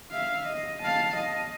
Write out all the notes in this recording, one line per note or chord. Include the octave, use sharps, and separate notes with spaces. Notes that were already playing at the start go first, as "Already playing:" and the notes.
E5 F5
D#5
F5 A5
D#5